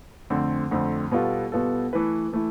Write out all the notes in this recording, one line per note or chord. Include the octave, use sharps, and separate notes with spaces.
F2 D3 A3 C4
F2 D3 A3 C4
B2 G3 B3 F4 A4
B2 G3 B3 F4 A4
E3 A3 E4 B4
E3 A3 E4